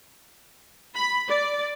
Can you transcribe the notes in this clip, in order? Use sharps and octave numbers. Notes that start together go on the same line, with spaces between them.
B5
D5